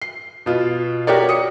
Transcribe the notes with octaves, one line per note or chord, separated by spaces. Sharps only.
C7
B2 F4
F#4 G4 A#4 C#5 D5
D#6 C#7